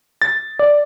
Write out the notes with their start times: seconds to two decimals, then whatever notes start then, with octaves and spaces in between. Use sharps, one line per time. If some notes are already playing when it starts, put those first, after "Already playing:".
0.22 A6
0.59 D5